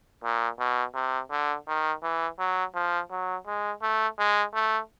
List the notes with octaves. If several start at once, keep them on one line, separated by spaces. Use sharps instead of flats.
A#2
B2
C3
D3
D#3
E3
F#3
F3
F#3
G#3
A3
G#3
A3